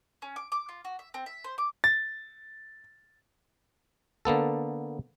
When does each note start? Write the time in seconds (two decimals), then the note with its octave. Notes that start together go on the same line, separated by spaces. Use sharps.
0.22 C#4
0.36 D6
0.52 D6
0.69 F4
0.85 F#4
0.99 E5
1.14 C4
1.26 E5
1.44 C5
1.58 D6
1.84 A6
4.25 D3 A#3 B3 A4